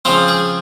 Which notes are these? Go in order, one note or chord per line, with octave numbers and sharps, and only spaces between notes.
C#3 F3 C4 F4
G#4